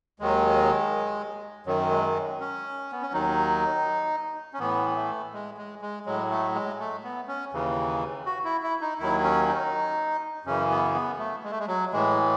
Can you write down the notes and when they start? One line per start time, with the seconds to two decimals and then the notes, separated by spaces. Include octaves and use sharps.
0.20 D#2 D#3 F#3 G#3
1.66 F#2 D#3 F#3
1.90 G#3
2.40 C#4
2.92 B3
3.02 C#4
3.13 D#2 D#3 F#3 D#4
4.54 C#4
4.59 A2 E3 B3
4.96 A3
5.33 G#3
5.57 G#3
5.82 G#3
6.06 A2 F#3 G#3
6.31 A3
6.55 G#3
6.79 A3
7.04 B3
7.28 C#4
7.53 D#2 C#3 E3
8.26 F#4
8.44 E4
8.63 E4
8.81 D#4
8.99 D#2 D#3 F#3 E4
9.23 C#4
9.48 D#4
10.45 F#2 C#3 E3 C#4
10.70 B3
10.94 B3
11.19 A3
11.44 G#3
11.51 A3
11.59 G#3
11.68 F#3
11.93 A2 E3 G#3